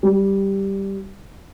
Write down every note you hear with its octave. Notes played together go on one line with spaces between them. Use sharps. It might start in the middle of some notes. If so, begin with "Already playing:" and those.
G3